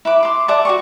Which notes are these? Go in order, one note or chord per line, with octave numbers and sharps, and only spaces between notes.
E4 B4 D6
C6 D6
D5 E5 F#5 A5
F#4 G#4 C#6